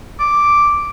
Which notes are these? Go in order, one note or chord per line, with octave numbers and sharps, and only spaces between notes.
D6